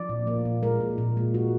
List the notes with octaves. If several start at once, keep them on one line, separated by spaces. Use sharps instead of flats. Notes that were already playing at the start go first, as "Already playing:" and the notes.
Already playing: F3 D5
A#2
A#3
A#2
G#3 A#4
A#2
A#2
G#3
G#3 F#4